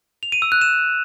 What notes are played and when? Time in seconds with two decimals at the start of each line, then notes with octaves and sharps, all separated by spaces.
0.23 F7
0.32 D#7
0.42 E6
0.52 F#6
0.61 E7